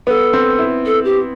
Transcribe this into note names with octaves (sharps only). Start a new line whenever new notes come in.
B3 A4
C4
E4
A4
G4